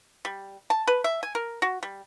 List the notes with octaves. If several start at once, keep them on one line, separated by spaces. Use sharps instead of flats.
G3
A5
B4
E5
G#5
A#4
F#4
G3